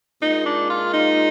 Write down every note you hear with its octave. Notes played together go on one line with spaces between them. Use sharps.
A#2 G#3 D#4
D4
F4
D#4